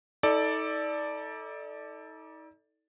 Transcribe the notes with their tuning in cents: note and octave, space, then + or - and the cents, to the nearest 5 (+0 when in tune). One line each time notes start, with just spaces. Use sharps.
D#4 +40 A4 +0 D5 +0